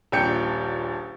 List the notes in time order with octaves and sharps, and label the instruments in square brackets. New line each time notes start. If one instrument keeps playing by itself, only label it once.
[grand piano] D#1 A#1 G5 G6 C#7